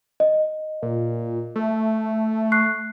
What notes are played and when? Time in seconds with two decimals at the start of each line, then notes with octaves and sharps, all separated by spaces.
0.20 D#5
0.82 A#2
1.56 A3
2.52 C#6 F#6 C7